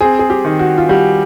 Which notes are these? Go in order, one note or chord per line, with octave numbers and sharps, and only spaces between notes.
C4 G#4
G#4
G4
D#3
F#4
F4
G3 F#4